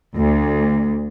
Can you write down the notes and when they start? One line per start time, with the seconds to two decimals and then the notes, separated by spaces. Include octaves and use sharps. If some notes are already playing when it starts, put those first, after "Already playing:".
0.16 D2